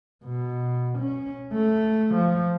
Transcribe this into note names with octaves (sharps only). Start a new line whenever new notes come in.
B2
C#4
A3
F3